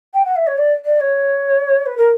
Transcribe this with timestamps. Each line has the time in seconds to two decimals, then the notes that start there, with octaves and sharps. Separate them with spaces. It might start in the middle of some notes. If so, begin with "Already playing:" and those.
0.14 G5
0.25 F#5
0.36 E5
0.47 C#5
0.58 D5
0.85 D5
1.01 C#5
1.86 B4
1.97 A#4